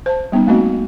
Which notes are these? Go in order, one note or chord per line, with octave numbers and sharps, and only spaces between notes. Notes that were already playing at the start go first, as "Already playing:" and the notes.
C5 A5
G3 B3 C#4 D#4
A3 A#3 C4 D#4 F#4 D#5